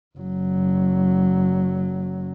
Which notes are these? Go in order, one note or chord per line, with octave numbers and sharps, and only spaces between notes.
F#1 F#3